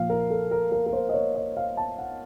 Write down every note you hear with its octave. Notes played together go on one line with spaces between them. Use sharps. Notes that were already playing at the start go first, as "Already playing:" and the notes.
Already playing: A#2 F3 F5
A#4
A4
A#4
A#4
A#4
C5
D#5
C#5
D#5
F5
A5
F#5